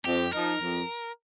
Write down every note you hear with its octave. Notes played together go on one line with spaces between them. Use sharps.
F2 G4
F3 D#4 A#4
F2